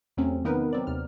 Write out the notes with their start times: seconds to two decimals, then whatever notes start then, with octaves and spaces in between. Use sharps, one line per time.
0.17 E2 C3 F#3 A3 C4 C#4
0.44 D#3 A#3 B3 D#4 A#4 B4
0.73 F#3 C4 D5
0.87 D#2 C3 F6